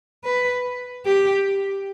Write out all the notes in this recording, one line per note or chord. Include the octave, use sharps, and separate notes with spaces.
B4
G4